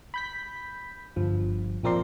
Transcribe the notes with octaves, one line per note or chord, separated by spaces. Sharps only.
B5 G6 B6
G1 G2 F3
A#1 F3 C4 A#4 D5 C6